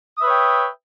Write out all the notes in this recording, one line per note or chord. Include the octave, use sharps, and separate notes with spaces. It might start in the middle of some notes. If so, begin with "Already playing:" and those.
B4 C#5 E5 G5 D#6